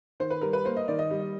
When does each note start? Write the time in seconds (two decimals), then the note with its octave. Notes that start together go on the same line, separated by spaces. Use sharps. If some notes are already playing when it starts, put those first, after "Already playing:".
0.20 D#3 C5
0.30 B4
0.41 G3 A#4
0.53 B4
0.65 A#3 C5
0.77 D#5
0.88 D#3 D5
0.99 D#5
1.11 G3